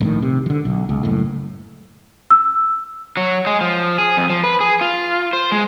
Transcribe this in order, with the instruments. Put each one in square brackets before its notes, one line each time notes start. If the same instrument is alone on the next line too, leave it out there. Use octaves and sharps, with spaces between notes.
[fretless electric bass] A#1 A2 D#3
C3
D3 E3
B1
C#2
F#1 A2
[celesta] E6
[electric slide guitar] F#3
G#3
F3
G#4
F2
F3
B4
G#4
F4
C5
G#3